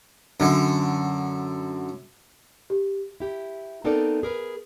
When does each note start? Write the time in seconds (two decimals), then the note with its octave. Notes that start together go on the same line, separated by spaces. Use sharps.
0.40 F#2 D3
2.70 G4
3.20 E4 G4
3.85 B3 C4 D#4 A4 A#4 D5
4.23 G#4 A#4 B4